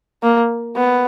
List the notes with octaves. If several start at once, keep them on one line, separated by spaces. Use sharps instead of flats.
A#3
B3